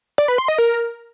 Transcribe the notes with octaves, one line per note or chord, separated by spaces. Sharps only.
D5
B4
C6
D#5
A#4